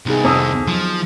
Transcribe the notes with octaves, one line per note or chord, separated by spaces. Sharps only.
C2 B3 D#4 G#4
F2 D#3 D#6 E6
F3 F#3